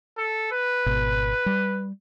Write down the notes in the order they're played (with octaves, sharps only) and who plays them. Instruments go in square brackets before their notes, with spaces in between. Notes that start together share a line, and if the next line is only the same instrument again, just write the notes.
[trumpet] A4
B4
[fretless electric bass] G#1 B2
G3